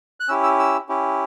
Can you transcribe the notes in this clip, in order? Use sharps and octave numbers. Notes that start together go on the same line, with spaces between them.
F#6
C#4 E4 G4 E6
E6
E6
C#4 E4 G4